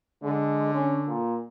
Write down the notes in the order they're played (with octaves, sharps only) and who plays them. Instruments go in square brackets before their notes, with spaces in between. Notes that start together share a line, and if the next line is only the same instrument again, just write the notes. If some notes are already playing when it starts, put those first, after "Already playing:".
[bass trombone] D3 [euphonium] G#3
[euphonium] C#4
A#2